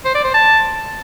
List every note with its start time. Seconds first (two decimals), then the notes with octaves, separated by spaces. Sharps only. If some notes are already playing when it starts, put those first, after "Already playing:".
0.05 C5
0.15 D5
0.25 C5
0.34 A5